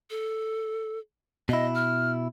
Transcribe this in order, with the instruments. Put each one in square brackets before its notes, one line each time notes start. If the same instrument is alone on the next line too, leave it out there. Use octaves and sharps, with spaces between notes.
[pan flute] A4
[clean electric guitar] B2 E4 [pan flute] D#5
[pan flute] F6